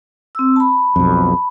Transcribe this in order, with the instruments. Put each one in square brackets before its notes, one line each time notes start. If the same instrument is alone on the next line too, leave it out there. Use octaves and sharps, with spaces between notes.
[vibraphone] C4 E6
A5 B5
[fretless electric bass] B1 F2